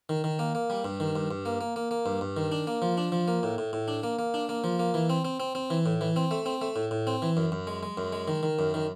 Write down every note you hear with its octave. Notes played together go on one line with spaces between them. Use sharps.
D#3
D#3
A#3
A#3
G3
G2
D#3
G2
G2
A#3
A#3
A#3
A#3
G2
G2
D#3
D4
A#3
F3
D4
F3
A#3
A2
A2
A2
D4
A#3
A#3
D4
A#3
F3
A#3
E3
C4
C4
C4
C4
E3
A2
E3
C4
A3
C4
A3
A2
A2
C4
E3
F#2
F#2
G#3
G#3
F#2
G#3
D#3
D#3
F#2
D#3